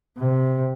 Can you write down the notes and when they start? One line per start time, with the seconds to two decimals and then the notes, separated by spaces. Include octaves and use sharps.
0.18 C3